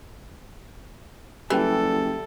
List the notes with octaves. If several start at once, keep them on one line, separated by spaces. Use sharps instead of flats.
F#1 E3 G3 A4 G5